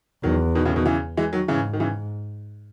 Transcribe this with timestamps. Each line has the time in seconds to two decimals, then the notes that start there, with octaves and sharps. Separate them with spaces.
0.23 E2 D#3 F#3
0.55 B2 D#3
0.65 A2 C#3
0.76 B2 D#3
0.86 C#3 E3
1.17 E3 G#3
1.33 D#3 F#3
1.48 G#2 C#3 E3
1.73 D#3
1.80 C#3 E3